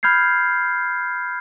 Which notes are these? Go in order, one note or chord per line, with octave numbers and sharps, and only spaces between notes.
B5 F6 G6 G#6 C7